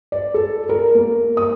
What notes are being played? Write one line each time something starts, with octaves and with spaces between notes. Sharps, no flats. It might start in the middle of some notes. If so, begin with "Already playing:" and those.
D5
A4
A#4
A#3
D#6